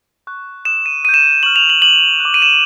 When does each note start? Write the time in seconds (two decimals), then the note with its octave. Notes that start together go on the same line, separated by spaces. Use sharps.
0.27 C#6 F#6
0.65 D#6 F#6 E7
0.86 D#7
1.04 D#6 D#7
1.09 G6
1.14 E7
1.43 C#6 F6 F#7
1.56 F7
1.70 F#7
1.82 D6 F6 F#7
2.20 F#6
2.25 D6
2.34 D#7
2.42 E7